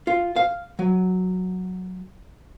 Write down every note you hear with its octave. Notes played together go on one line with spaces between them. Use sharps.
F4
F5
F#3